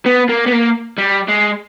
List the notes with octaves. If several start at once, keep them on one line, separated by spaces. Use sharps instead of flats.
B3
A#3
B3
A#3
G3
G#3